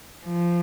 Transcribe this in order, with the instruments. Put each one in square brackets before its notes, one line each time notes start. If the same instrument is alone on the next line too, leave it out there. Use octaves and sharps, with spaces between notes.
[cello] F3